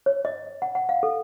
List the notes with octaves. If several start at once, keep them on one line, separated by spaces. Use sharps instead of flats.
C#5
D#5
F#5
F#5
F5
A4